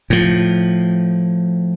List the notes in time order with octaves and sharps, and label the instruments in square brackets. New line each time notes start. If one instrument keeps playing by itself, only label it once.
[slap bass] A2 F3